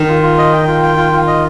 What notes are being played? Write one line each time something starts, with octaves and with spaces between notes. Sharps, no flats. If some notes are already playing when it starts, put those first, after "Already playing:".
Already playing: D#3
F4
F4
D#5
G5
F4
G5
F4
F4
D#5